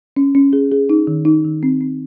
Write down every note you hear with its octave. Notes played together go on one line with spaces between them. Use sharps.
C#4
C#4
G#4
G#4
D#4
D#3
D#4
D#3
C4
C4